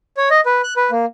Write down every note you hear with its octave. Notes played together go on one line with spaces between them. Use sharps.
C#5
D#5
B4
F#6
B4
A#3